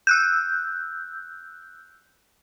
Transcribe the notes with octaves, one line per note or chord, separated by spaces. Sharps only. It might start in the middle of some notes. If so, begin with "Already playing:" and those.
E6 F#6 G6